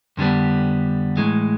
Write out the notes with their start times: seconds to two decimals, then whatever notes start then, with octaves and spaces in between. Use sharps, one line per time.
0.17 F2 D3 G3 B3
1.17 A2 E3 G#3